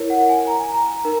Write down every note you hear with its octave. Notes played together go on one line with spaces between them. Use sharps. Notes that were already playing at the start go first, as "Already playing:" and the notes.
Already playing: E4 A#4 C#5
F#5
G#5
A#5
G#5
A#5
D#4 A#4